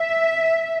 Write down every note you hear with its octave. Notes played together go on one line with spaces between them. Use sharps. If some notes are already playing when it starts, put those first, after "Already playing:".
Already playing: E5